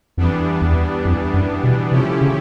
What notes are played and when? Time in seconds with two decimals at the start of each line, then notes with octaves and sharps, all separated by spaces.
0.17 F2 E3 G3 B3 D4
0.61 E2
1.05 F2
1.34 F#2
1.64 B2
1.92 C3 F3 A3 C#4 E4 G4
2.21 C#3